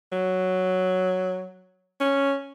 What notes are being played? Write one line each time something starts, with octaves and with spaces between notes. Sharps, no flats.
F#3
C#4